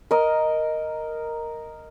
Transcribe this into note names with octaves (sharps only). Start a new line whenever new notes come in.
A#4 D#5